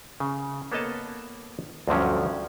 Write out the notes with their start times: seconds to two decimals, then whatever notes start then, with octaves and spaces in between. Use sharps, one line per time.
0.20 C#3
0.72 A#3 B3 A4 C#5 D#5 A5
1.88 D2 G2 D3 F3 F#3 C#4